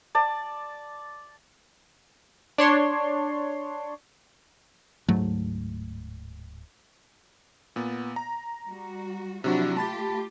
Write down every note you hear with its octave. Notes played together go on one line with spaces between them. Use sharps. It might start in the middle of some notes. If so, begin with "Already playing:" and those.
D5 A5
D4 C#5 C6
D1 G#2 F#3 A3
A#2 B3
A#5
G3 F#4
C3 F3 F#3 D4 E4 F#4
A3 F4 G4 A5 B5 A6